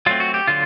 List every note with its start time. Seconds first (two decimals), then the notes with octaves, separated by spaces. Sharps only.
0.06 F#3 A3 C4 F4
0.20 F#4
0.34 G4
0.47 D3 F#3 F4